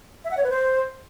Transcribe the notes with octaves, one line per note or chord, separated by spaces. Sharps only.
E5
F#5
C#5
B4
C5